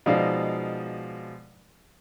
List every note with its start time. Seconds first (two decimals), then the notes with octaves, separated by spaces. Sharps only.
0.06 B2 F3 G#3 D#4 D5 F5